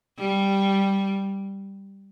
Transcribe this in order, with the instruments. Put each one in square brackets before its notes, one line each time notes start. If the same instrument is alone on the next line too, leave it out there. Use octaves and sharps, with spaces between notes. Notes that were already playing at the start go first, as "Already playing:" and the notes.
[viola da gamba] G3